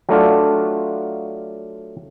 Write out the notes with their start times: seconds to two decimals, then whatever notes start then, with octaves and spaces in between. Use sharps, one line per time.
0.09 F#3 A3 D4 F4